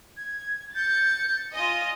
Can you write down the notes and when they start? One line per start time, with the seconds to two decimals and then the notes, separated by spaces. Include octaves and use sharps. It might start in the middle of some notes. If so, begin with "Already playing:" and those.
0.17 G#6
0.75 G6 A6 C#7
1.54 F4 D#5 G#5